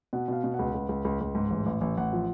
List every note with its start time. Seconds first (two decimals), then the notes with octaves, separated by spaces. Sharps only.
0.13 B2 F#5
0.28 B2 F5
0.44 B2
0.54 C#2 F#5
0.74 C#2
0.89 C#2
1.05 C#2
1.21 C#2
1.35 G#2
1.50 A1
1.66 A1
1.81 A1
1.97 A1 F#5
2.13 F3